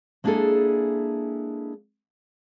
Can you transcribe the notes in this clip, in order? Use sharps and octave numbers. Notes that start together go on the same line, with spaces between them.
G#3 A#3 D4 E4 G#4 A4